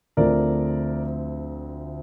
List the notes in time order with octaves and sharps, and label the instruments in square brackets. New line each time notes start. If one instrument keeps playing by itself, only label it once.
[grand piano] D2 D3 F3 A3 C4 A#4 D5